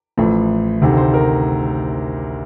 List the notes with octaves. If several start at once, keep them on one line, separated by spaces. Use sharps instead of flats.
A1 A2 F3
D2 C3 D#3
C5
A#4